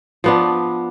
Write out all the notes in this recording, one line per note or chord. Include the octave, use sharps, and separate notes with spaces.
F3 B3 D4